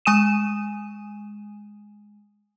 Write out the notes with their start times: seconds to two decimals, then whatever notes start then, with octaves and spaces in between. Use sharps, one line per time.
0.05 G#3 G#5 D#6 D#7 E7